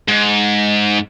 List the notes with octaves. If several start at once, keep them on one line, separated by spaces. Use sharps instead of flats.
G#2